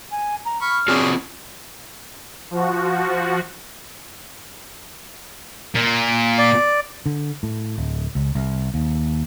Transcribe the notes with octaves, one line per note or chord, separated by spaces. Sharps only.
G#5
A#5
B5 C#6 F6
C4 D4 F4 F#4 G#4 C#5
F3 F#4
A#2
D5
D3
A2
D1
C#2
C2
D#2